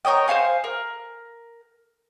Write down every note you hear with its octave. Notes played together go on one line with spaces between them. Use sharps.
A#4 C#5 D#5 G5
C5 C#5 F5 G#5
A#4